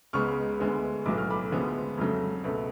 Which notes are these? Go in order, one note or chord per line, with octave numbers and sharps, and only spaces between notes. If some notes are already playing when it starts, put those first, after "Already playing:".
C#2 C#3 G#3 B3 C#6 F6
D2 D3 G#3 B3
B1 A2 F#3 B3 D6
F6
B5 D6
D2 D3 F3 G#3 B3
F2 C#3 F#3 A3
C#2 B2 A3